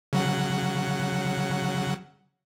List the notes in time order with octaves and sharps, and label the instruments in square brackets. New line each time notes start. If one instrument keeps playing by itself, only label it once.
[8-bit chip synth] C#3 F#3 F#5